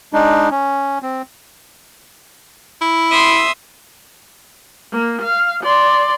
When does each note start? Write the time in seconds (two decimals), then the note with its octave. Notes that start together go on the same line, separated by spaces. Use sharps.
0.13 G#3 D4 D#4
0.51 C#4
1.02 C4
2.81 E4
3.10 E5 C6 D#6
4.92 A#3
5.22 F5
5.64 D5 C6